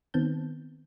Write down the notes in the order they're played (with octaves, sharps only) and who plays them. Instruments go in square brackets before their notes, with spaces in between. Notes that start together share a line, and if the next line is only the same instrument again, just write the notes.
[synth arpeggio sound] D#3 B3 C4 A5 G6